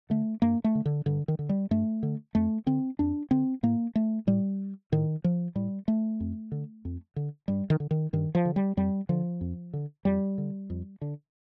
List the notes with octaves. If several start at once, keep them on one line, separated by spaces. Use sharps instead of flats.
D3 A3
G2 A#3
A3
D3
D3
G2 D3
D#3
D3
G3
G2 A3
D3
F2 A3
D3 C4
F2 D4
D3 C4
A2 A#3
A3
A2 G3
A2 D#3
F3
A2 G3
A3
F2
D3
F2
D3
G2 G3
D#3
D3
D#3
G2 D#3
F3
D3
G3
F2 G3
D3 F3
F2
D3
F2 G3
D3
F2
D3